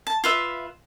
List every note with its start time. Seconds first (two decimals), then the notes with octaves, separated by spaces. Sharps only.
0.07 A5
0.24 F4 B4 E5